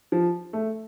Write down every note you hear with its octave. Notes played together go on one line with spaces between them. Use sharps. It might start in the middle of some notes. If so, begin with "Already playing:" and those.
F3
A3